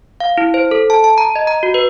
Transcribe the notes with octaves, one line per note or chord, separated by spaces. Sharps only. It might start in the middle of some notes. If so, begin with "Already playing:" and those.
F5
E4
C5
A4
A5
A5
A#5
D#5
A#5
F#4
B4